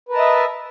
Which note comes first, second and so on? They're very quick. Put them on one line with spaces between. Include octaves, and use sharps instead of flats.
B4 A#4 A5 D#5 E5